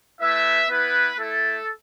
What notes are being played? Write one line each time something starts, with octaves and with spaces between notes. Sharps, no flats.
A3 E4 B4 E5
B3 E4 B4
A3 E4 A4